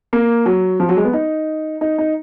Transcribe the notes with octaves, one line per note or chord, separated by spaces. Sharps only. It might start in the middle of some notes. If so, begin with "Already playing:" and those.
A#3
F#3
F3
F#3
G#3
B3
D#4
D#4
D#4